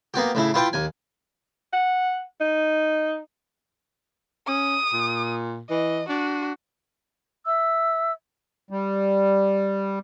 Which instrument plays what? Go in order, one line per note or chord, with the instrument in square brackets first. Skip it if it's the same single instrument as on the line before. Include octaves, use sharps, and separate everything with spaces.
[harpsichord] A#3 B3 F#4 G4
A2 C#3 E4
E4 F4 G4 B4 G5 A5
D#2 G#5
[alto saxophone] F#5
D#4
[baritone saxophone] C#4 [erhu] D#6
[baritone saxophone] A#2
[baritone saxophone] E3 [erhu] D#5
[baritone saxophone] D4 [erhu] F#4
[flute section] E5 E6
[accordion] G3